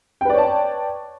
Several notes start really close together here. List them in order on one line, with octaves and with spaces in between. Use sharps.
G5 B4 D5 C#5 A5